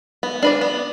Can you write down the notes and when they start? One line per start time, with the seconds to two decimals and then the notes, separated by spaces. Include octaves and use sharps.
0.23 B3
0.43 D4 B4 D5
0.61 B3